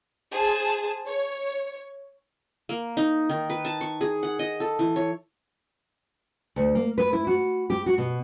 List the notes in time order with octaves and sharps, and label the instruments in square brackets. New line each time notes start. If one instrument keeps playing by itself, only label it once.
[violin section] G#4 C5 A5
C#5
[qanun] A#3
D#4
D#3
B4
A5
C#6
G#4
F#5
D#5
A4
E3
C#5
[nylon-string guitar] D2
A#3
B4
E4
F#4
G4
F#4
B2